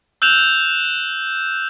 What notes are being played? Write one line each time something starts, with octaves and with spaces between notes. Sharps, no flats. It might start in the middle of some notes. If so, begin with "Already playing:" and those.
E6 F#6 G6 E7 F7